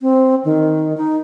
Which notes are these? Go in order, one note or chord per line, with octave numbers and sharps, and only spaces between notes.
C4
D#3
D#4